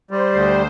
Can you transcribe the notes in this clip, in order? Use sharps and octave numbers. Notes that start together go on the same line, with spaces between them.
G3 C5
D2